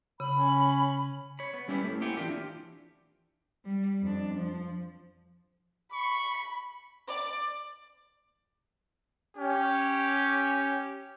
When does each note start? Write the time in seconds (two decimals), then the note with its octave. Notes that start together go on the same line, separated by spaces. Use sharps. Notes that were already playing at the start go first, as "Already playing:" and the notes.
0.20 C#3 B5
0.36 C#4
1.39 C#5 B5
1.54 B3
1.68 G3 C#4 E4 G4 A#4 B4
1.84 A2 A3
2.01 A#3 C4 E4 G4 F#5 G#5
2.17 E3 D4 F4 G4
3.65 G3
4.01 F2 D4
4.34 F3
5.93 B5 C#6
7.08 D5
9.37 C#4 G4